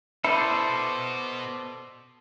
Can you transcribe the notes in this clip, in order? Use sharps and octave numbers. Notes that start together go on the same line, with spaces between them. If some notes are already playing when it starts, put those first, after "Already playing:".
B2 E4 A4 C5 D5